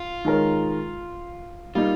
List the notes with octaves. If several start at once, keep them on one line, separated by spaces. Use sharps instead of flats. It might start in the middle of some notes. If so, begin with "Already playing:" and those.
Already playing: F4
D#3 G#3 D#4 A#4 C#5
G3 A#3 D#4 F4